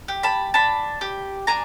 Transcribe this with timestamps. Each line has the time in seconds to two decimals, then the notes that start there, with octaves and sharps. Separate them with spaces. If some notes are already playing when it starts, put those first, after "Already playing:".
0.08 G4
0.23 A5 B5
0.54 D4 A5 B5
1.01 G4
1.47 D4 G#5 A#5